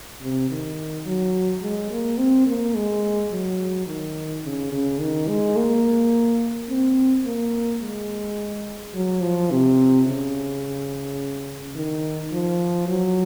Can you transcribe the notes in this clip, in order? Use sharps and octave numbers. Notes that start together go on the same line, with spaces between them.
C3
D#3
F#3
G#3
A#3
C4
A#3
G#3
F#3
D#3
C#3
C#3
D#3
G#3
A#3
C4
A#3
G#3
F#3
F3
C3
C#3
D#3
F3
F#3